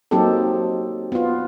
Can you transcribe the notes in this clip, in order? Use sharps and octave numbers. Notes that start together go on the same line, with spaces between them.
F#3 A#3 C4 D#4 G4 A4
B3 F4